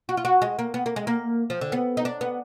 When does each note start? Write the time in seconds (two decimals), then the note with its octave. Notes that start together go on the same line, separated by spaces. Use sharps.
0.09 F#4
0.17 F4
0.25 F#4
0.42 G#3
0.59 A#3
0.74 B3
0.86 A#3
0.96 G#3
1.07 A#3
1.50 F3
1.61 D3
1.72 B3
1.97 D#4
2.05 D4
2.21 B3